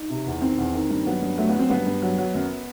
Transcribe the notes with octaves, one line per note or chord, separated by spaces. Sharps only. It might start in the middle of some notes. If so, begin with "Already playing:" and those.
Already playing: D#4
C3
E2
D#3 C4
E2
D#3
G2
F#3 B3
G2
F#3 A3
B3
F#3 C4
G2 B3
G2
F#3
F#3
F#2